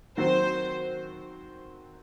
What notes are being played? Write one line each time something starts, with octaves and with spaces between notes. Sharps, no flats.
D#3 F#3 C4 F#4 C5